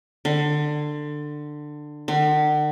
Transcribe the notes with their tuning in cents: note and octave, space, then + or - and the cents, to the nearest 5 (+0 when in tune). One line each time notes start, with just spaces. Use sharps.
D3 +20
D3 +45